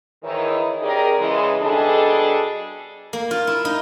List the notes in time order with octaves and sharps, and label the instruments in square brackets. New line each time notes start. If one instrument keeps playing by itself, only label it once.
[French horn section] G#2 D#3 E3 D#4 E4 C#5
C#4 G4 G#4 A#4 D5 D#5
C#3 E3 G#3
B2 G3 D4 G#4 A4 D#5
[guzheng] A#3
F4
E4
D#4